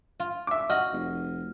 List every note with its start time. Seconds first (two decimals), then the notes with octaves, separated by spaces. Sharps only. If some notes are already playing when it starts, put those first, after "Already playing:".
0.20 F4
0.47 E5 D6
0.70 F#4 D#5 F6
0.93 F1